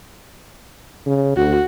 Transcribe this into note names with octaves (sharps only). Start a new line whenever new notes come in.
C#3
D2 F#4